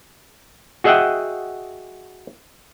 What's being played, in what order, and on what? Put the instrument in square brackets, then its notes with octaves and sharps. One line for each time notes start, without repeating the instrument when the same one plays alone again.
[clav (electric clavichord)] F#4 G#4 D#5 E5 F#5 G5